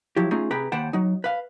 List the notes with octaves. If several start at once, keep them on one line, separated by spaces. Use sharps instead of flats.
F3 F#3 E4 G4
A3 C#4 D#4 F4 G#4
C3 G#4 B4 G5 A#5 B5
D#2 C5 F#5 G5 A5 B5
F#3 D#4
B4 F5